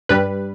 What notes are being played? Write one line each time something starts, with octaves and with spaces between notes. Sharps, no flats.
G2 G3 B4